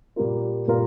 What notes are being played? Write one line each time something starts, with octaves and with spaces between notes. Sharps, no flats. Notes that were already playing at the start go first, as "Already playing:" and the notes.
A#2 G3 A#3 F4 A#4
A#2 G3 A#3 F4 A#4